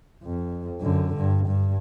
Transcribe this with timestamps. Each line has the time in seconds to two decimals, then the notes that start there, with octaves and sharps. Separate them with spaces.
0.23 F2
0.81 F#2 D3
1.17 G2
1.48 G2